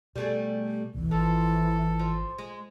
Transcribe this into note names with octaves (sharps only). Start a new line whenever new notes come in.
B2 G3 A3 G#4
F1 C2 B2 E3
G#1 F3 A4
F3
G#3